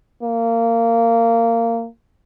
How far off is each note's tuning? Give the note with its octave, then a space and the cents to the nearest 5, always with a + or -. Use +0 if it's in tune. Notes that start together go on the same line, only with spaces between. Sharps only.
A#3 -20